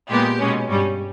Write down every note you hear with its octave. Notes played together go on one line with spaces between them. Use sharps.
A#2 G#3 B3 G4
B2 G#3 C#4
G2 G3 C#4